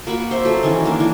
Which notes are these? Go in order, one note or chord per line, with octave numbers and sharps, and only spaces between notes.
A#3 F#4 B5 C#6
C5 E5
F#3 A4
D#3 E3 C#4
A#3 D4
E3